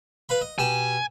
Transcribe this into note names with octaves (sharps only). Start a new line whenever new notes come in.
B4 F5 B5
D#5
B2 G4 G#5 A5